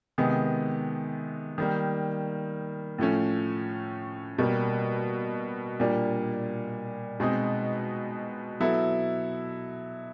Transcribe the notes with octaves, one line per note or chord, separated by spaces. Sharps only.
C3 D#3 G#3 B3
D#3 G3 A#3
A2 F3 A3 C#4
B2 G3 A#3
A#2 G3 A#3 D4
B2 G#3 C4 D#4
F#3 B3 E4 A4